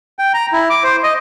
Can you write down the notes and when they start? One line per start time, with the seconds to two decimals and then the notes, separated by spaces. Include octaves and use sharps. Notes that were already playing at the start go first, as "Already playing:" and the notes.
0.19 G5
0.34 A#5
0.52 E4
0.70 D6
0.83 C5
1.03 D#5